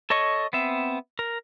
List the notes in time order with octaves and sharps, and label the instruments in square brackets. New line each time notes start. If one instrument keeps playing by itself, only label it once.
[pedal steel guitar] A4 C#5 D#5 C#6
B3 C4 E5
A#4